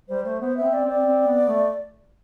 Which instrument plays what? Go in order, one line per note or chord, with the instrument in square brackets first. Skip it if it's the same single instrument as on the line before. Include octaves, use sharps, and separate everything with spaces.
[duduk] G3 [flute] C5
[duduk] A3 [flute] C5
[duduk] B3 [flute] C5
[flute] E5
[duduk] C4
[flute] D5
[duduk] C4 [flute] D5
[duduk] C4
B3
A3